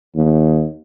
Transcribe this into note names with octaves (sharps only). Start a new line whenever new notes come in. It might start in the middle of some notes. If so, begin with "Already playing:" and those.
D#2